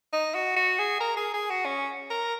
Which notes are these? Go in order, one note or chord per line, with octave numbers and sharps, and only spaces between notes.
D#4
F#4
F#4
G#4
A#4
G#4
G#4
F#4
C#4
A#4